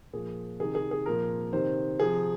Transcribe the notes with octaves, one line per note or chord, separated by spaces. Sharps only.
A#2 F3 G#4
C3 D#3 G#4
G#4
G#4
A#2 F3 A#4
C3 D#3 C5
C3 F3 G#4